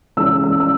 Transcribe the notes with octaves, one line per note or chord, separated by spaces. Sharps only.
E3 G#3 C#4 E6
E6
E6